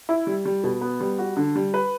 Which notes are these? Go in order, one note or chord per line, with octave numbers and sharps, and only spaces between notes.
E4
G3
G3
B2
B3
G3
F#4
D3
G3
B4